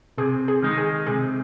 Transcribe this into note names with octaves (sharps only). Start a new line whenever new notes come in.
C3 G#4
G#4
D#3 G#3 D#4
G#4
C3 G#4